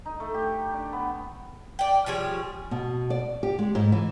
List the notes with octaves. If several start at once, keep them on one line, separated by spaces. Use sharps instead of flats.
D#4
A3
G4
D4
B3
D5 G5
F3 G3 G#4 C#5
B2
D5
G4
G#3
G#2
E3